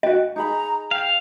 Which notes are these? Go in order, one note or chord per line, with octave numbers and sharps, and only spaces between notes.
F#4 D#5 G5
D#4 G#4 A#5 B5
F5 G5